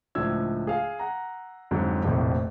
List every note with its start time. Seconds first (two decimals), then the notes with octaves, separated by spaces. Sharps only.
0.15 C#2 A2 F3 D4 E6 G#6
0.67 G#4 F5 G#5
0.99 F#5 A#5
1.71 F2 G#2 D3 F#3 G#3
2.04 F1 A#1 F2 A2